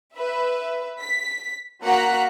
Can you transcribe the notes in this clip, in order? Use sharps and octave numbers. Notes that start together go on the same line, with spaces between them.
B4 E5
B6
A#3 F#4 F#5 A#5 F#6 B6